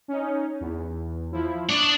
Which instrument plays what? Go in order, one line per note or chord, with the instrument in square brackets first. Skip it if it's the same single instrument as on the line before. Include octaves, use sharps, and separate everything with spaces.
[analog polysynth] C#4 D#4
E2
F3 E4
[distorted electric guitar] D4 D5 [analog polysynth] C#6 D#6